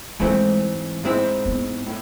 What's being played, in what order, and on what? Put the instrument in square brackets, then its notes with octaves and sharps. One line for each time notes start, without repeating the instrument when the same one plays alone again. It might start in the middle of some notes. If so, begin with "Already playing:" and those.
[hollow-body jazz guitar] G#2 E3 A3 C4 E4 [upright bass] G#3
[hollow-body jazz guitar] G#2 G#3 C4 E4
[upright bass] B3
[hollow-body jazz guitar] A2